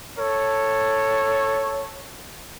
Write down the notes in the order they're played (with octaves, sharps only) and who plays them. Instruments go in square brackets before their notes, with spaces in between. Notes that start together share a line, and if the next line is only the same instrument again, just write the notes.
[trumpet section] A4 C#5